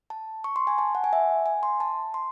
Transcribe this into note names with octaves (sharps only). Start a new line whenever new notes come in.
A5
C#6
C6
G#5
A5
F#5
G#5
E5
G#5
C6
A5
C6